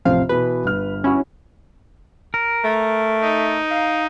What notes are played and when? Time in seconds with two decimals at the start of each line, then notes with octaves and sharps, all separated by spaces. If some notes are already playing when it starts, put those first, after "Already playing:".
0.05 A1 F2 C3 F3 F5
0.29 B2 E3 B4
0.65 G1 F6
1.04 C#4 E4 F#4
2.34 A#4
2.64 A3
3.21 D#4
3.71 F5